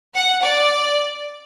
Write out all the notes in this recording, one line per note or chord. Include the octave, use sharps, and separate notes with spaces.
F#5
D5